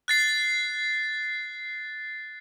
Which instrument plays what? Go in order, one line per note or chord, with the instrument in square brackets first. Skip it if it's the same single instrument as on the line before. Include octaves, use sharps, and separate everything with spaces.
[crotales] F#6 A6 C7